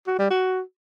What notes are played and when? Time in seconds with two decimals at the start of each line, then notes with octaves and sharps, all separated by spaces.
0.07 F#4
0.19 G3
0.30 F#4